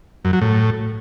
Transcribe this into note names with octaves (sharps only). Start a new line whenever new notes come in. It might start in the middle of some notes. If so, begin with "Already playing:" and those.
F#2
F#3
A2